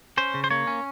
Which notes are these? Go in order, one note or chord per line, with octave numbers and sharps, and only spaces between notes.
C#4 C5
C#3
C5
A#3 C#5
C#4